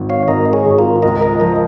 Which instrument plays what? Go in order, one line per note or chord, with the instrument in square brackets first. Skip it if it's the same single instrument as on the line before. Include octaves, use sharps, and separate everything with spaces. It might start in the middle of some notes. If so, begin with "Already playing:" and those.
Already playing: [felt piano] G#1 D#3
[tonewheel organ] C#5 F5
[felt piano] G#1 [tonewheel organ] A#4 D#5
[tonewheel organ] G#4 C#5
[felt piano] G#1
[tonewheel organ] F4 A#4
[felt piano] C#2 [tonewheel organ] A#4 D#5
[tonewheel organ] A#4 D#5
[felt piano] F3 [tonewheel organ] A#4 D#5